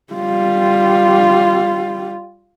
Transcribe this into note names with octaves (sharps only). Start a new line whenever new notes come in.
G3 F4